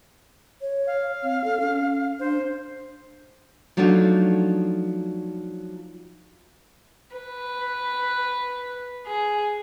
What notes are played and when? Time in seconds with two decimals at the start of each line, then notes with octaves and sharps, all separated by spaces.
0.61 C#5
0.87 F5
1.23 C4
1.44 A4
1.60 C#4
2.20 D4 C5
3.77 F3 F#3 A3 D4 D#4 F4
7.17 B4
9.07 G#4